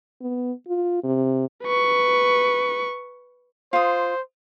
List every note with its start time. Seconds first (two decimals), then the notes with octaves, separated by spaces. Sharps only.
0.21 B3
0.68 F4
1.03 C3
1.64 B4 C#6
3.73 F4 C5 D#6